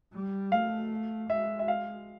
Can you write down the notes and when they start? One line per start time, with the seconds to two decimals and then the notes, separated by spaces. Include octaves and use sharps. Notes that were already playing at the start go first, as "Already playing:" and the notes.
0.13 G3
0.51 A3 F5
1.30 G#3 E5
1.59 E5
1.68 F5